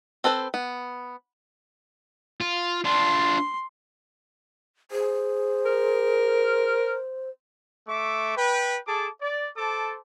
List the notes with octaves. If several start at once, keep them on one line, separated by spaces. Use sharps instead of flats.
C4 A4 B4 C5
B3
F4
D4 F4 C6
G#4 C5
A#4
A3 E5 C#6 D6
B4 G5
G#4 A4 A5 D6
D5
A4 C5 A5 D6